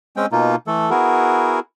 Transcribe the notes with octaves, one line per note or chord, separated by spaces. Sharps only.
G#3 C4 C#4 G5
B2 A#3 D#4 F4
E3 A3 A4
B3 E4 F#4 G#4 A#4